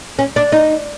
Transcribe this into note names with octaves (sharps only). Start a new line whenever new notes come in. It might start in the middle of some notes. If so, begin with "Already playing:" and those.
C#4
D4
D#4